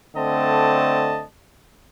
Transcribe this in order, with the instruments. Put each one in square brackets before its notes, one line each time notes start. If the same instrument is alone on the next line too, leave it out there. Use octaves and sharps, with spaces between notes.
[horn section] D3 A3 C4 D5 D#5 A5